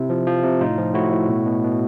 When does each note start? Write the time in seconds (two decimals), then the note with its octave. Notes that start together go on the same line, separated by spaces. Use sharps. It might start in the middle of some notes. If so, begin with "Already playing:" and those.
Already playing: C3 E4
0.10 F3
0.27 F3
0.44 C3
0.61 A2 D#4 F4
0.78 F3
0.94 A2 E4 F#4
1.12 A2
1.29 B2
1.46 B2
1.63 B2